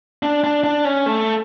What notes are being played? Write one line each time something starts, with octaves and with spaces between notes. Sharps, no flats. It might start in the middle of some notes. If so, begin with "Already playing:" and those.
D4
D4
D4
C#4
A3